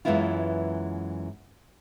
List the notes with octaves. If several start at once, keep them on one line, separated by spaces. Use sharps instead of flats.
F#2 E3 G#3 B3 E4 F4